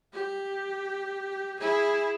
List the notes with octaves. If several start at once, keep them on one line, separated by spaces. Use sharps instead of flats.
G4
E4 G#4